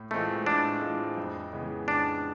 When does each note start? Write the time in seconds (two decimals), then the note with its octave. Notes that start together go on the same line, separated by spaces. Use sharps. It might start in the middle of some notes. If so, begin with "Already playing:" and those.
Already playing: A2
0.11 E3 G#3 A3 C4 F4
0.46 A2 D4
0.82 E3 G#3 C4 F4
1.17 F2
1.53 C#3 E3 G#3 B3
1.88 F2 D4